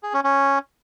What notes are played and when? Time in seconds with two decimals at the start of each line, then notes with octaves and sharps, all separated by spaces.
0.03 G#4
0.14 C#4
0.24 C#4